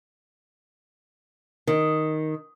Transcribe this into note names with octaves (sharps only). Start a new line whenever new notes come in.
D#3